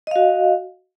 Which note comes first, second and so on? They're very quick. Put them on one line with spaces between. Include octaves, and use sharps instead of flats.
D#5 F5 F#4